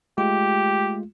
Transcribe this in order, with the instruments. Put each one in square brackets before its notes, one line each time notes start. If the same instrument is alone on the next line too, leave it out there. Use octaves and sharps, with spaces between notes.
[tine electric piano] G#3 A3 F4 [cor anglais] G4